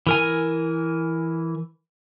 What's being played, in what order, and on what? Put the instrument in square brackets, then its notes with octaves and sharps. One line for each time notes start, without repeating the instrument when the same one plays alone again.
[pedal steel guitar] E3 A#4 G#5